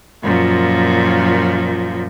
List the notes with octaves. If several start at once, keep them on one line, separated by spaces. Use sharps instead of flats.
F#2 A#2 F3